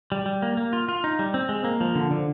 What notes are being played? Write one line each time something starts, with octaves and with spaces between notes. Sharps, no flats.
G3
G3
A#3
A#3
F4
F4
D#4
G3
C4
G#3
A#3
F3
D3
D3